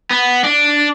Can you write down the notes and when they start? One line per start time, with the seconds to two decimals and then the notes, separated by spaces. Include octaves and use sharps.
0.11 B3
0.44 D4